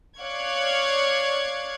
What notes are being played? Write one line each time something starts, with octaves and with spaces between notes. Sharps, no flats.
C#5 D5 F5 C#6 F#6 G#6